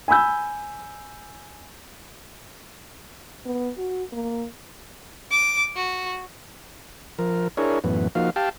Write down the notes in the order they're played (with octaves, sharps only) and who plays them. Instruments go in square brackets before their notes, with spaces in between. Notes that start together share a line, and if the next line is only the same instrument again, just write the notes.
[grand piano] G#5 B5 E6 G6
[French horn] B3
F#4
A#3
[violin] D6
F#4
[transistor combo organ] F3 A#4
D4 E4 G#4 A#4 C#5
F#2 A2 E3 B3
F3 A#3 D#4 F#4 F5
G4 F5 G5 A5